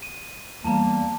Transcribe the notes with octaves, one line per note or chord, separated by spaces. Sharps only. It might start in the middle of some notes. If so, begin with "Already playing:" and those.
D#7
E2 G3 A#3 A5 A#5